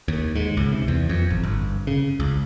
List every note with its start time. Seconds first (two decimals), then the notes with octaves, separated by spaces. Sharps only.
0.08 D#2
0.35 G#2
0.57 C#2
0.72 C3
0.88 E2
1.09 F2
1.30 G#1
1.43 G1
1.87 C#3
2.20 C#2